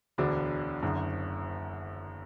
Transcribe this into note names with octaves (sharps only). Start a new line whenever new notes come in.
E1 D2 D3 D4 F#4
F#1 F#2 D3